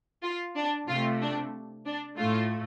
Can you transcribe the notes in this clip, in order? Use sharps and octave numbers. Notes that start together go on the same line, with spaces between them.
F4
D4
C3 A3 F4
D4
D4
A2 A3 F4